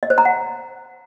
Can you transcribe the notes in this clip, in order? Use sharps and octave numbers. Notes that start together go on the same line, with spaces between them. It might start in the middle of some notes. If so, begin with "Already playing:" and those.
D#5
C5
A#5
F#5